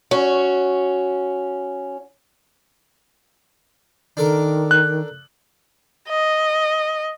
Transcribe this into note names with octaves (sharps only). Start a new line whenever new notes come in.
C#4 F#4
D#3 D4 A4 A#4
F#6
D#5